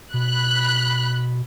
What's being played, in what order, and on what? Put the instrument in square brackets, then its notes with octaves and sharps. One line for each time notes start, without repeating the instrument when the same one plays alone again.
[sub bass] B2 [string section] B5 F#6